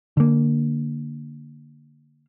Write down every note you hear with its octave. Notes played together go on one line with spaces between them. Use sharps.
D3 A#3